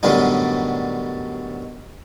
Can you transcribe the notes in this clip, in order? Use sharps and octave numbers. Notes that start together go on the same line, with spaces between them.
F#2 A2 D3 G3 B3 D#4